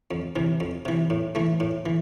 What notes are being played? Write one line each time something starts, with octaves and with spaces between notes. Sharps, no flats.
F2
C3 E3
F2
C3 E3
A2
E3 A3
A2
E3